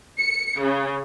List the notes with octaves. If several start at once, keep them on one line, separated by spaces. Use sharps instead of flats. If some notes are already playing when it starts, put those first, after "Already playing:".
C#7
C#3